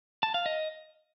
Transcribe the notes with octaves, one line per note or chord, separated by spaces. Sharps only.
A5
F5
D#5